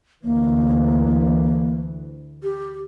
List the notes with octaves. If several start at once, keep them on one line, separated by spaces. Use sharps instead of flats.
D2 E3 A#3
G4